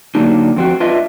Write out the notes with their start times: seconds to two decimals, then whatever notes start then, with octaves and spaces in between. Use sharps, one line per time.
0.15 D3 F#3 A#3 D4 D#4
0.56 F2 C4 F#4
0.80 D4 F4 B4 D#5 E5